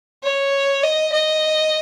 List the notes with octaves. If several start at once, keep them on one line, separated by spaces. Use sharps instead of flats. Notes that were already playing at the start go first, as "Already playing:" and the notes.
C#5
D#5
D#5